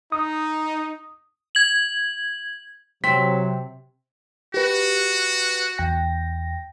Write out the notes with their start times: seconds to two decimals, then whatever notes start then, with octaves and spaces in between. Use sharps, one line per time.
0.12 D#4 D#6
1.55 G#6 F#7
3.04 C3 F#3 C4 B6
4.54 F#4 G4 B4
5.78 E2 G5 A#6